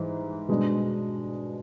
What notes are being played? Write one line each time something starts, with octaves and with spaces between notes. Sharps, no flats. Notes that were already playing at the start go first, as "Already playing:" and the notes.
Already playing: G#2 E3
B2 G#3 D4